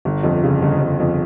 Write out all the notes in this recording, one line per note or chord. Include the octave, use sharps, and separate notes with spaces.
G1
F2
C#3
G1
G1
F2